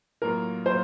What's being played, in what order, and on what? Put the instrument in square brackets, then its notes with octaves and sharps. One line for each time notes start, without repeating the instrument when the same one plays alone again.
[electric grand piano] A2 F#3 A#3 F4 [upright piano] A#4
[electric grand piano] A2 F#3 A#3 F4 [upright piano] C5